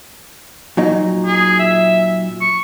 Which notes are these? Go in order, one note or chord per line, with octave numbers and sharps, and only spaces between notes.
A#2 F#3 D#4
G#4
E5
C#6